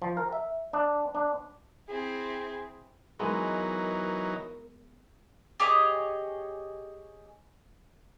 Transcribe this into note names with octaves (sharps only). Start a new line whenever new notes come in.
F3
A#4
E5
D4
D4
C4 E4 G#4
E3 F#3 G#3 B3 D#4 A#4
G4 G#4 C#5 D#5